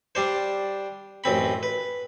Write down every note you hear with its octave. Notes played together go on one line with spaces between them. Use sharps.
G3 D4 C5
A1 F#2 C4 B5
B4